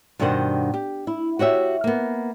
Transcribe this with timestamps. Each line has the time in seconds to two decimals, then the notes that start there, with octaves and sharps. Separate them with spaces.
0.19 G2 B2 D#3 D4 C5 F#5
0.74 G4
1.07 E4
1.39 F#4 G4 C#5 E5
1.84 A#3 B3